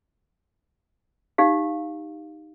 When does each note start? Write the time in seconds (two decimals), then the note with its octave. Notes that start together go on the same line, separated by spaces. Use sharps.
1.38 D#4 G4 F5